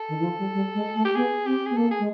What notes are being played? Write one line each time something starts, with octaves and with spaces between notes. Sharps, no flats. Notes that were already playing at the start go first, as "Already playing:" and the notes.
Already playing: A4
D#3
E3
F3
G3
G3
G#3
A3
G4
B3 G#4
C4 G4
B3 G#4
A#3 A4
G#4
G#3